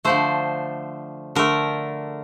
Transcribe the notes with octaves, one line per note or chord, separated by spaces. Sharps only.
D3 F3 A3 C5
D3 A3 A#4